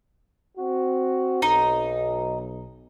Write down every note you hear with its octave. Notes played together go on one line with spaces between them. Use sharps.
C4 F#4
B1 D#4 D#5